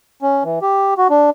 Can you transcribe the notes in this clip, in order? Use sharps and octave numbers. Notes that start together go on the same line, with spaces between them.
C#4
E3
G4
F#4
D4